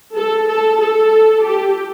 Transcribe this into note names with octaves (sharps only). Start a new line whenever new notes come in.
A4
A4
A4
G4